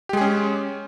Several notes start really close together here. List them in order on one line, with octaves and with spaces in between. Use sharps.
G4 G#3 G#4 C#4